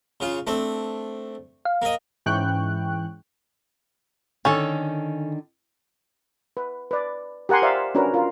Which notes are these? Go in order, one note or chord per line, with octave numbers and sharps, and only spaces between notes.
C#3 F4
A3 C4 D4
F5
A#3 D#5
G#2 E3 C#4 G5 C#6 F#6
D3 D#3 C#4 A4
B4
B4 D5
G4 A#4 F#5 G#5 C6
C5 D5 E5 F5 A#5
C#4 D4 F#4 A#4 B4
F4 A#4